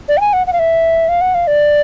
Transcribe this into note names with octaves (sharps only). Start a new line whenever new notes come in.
D5
G5
G#5
F#5
F#5
F5
E5
F5
F#5
F5
D5